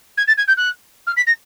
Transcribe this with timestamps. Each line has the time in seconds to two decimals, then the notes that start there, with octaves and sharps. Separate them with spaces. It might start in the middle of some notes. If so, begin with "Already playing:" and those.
0.17 G#6
0.27 A6
0.37 G#6
0.48 G6
0.57 F#6
1.07 F6
1.17 B6
1.27 A#6